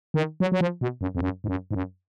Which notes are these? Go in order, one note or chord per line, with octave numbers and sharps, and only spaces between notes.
D#3
F#3
F#3
F3
B2
F#2
F2
F#2
G#2
F#2
G#2
F#2